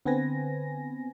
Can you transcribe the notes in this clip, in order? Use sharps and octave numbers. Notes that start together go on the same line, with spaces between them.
D3 B3 C4 B4 G#5 A#6